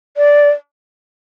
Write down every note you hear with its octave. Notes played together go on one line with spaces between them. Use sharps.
D5